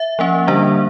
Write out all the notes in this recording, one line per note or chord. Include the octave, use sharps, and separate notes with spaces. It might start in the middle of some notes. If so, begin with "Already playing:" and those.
Already playing: E5
F3 A#3 C#4
D3 G3 A#3 D4